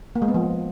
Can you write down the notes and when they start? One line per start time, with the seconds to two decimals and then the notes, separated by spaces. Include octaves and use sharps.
0.16 A#3
0.22 G#3
0.28 B3
0.34 F3